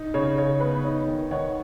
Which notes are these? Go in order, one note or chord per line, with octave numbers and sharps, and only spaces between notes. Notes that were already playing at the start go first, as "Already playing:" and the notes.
Already playing: D#4
C#3 C#5
C#3 C#5
B3 B4
D#4 C#5
D#3
D#3 C#5 F#5